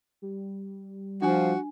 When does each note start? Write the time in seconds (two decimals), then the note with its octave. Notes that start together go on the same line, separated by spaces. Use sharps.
0.22 G3
1.22 F3 D4 F#4 G#5